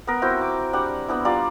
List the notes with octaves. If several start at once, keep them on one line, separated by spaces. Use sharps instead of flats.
B3 A#4
C4 E4 F#4 G5
D6
G3 D4 F#5
B3 D4 E4
G3 F4 D5 A#5